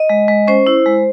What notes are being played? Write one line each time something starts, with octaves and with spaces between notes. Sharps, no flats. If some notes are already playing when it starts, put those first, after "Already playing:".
Already playing: D#5
G#3
G#3
C#4 C5
E4
G#3